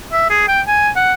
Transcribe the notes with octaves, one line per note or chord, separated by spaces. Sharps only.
E5
G#4
G5
G#5
F#5